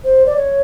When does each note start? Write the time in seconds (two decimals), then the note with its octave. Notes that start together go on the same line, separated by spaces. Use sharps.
0.04 C5
0.26 D5
0.37 C#5